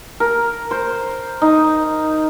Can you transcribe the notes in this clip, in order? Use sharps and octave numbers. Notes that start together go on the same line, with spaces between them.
A#4
C5
D#4